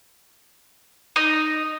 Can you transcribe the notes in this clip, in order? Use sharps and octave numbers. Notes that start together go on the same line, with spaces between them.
D#4